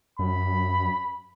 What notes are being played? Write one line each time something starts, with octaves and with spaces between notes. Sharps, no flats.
F#2 B5